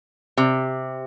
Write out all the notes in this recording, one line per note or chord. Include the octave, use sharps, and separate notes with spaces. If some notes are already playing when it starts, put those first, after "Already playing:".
C3